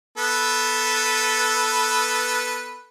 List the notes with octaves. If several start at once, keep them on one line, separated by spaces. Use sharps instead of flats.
B3 A4 B4